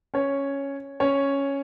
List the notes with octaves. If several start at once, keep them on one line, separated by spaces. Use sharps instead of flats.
C#4 C#5
C#4 C#5